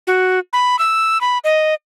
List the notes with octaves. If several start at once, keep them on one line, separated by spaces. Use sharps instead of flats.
F#4
B5
E6
B5
D#5